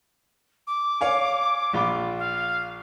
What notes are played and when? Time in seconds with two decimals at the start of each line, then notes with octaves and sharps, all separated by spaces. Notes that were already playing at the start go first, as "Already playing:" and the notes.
0.67 D6
1.01 C#5 F5 G#5
1.73 A#1 F4 B5
2.19 F5